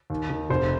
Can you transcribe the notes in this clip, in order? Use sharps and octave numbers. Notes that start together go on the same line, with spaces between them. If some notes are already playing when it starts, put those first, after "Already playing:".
D#2
D#3
F1 C5